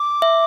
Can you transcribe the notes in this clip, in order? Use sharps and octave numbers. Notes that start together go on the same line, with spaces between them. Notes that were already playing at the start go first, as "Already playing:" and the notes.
Already playing: D6
E5